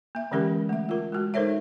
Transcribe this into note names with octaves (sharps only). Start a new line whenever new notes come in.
A#3 E5
D3 E3 G#3 C#4 G4 A#4
A3 E5
F4 A#4
G#3 F#4
D#4 A4 A#4 C5 C#5 E5